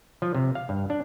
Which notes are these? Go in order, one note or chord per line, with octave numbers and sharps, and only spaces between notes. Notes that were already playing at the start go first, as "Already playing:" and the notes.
F3
C3
F5
G2
D4